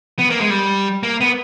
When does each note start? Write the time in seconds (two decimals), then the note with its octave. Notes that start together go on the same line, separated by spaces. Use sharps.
0.19 B3
0.30 A#3
0.40 G#3
0.50 G3
1.03 A#3
1.21 B3